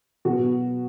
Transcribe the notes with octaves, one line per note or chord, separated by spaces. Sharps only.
B2 F#3 B3 F#4